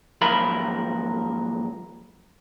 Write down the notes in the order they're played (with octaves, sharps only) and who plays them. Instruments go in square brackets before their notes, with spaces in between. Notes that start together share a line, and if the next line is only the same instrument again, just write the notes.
[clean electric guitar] D#2 G#2 F3 F#3 A#4 B5